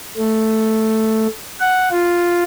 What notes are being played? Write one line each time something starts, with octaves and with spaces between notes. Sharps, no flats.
A3
F#5
F4